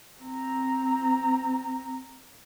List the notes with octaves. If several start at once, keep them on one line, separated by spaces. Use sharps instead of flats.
C4 A#5